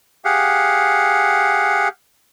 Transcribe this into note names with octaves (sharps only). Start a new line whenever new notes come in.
G4 G#4 F5 F#5